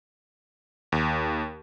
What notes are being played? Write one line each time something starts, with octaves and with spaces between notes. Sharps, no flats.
D#2